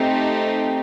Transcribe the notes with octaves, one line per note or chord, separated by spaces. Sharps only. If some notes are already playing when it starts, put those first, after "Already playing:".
Already playing: A3 C4 D#4 G4